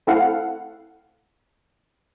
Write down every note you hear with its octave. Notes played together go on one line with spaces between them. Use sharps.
A3 C4 E4 A4 F5 F#5